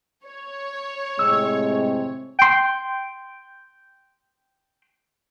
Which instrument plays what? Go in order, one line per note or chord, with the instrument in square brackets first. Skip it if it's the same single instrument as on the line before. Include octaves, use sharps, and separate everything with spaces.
[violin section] C#5
[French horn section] A2 C3 C4 [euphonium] G#3 [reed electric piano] E6
[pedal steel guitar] G5 C6